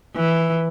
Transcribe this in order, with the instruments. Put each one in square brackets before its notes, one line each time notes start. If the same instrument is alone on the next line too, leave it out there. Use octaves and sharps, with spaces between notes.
[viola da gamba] E3